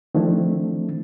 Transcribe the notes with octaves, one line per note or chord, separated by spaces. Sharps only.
D#3 F3 A3 C4 D4 E4